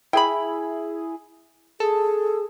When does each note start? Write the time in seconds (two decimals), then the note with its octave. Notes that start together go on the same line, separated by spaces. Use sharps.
0.13 E4 G#4 G5 B5
1.80 G#4 A4